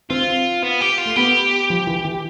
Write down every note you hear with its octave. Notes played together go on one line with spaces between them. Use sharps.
C4 F4
B3
G4
F4
A3
B3 G4
F3
E3
E3